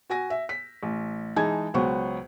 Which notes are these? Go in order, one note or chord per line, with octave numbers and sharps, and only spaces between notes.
F#4 G#5 A#6
E5
B6
A1
E3 G#3 D#4 A5 G#6
C#2 F#3 B3 C5 C#6